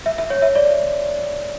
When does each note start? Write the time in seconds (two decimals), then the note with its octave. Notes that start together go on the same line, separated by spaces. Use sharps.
0.06 E5
0.18 E5
0.30 C#5
0.42 E5
0.55 D5